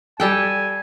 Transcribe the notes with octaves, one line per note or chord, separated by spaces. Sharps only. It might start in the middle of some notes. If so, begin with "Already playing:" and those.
G3 A4 G5 G#5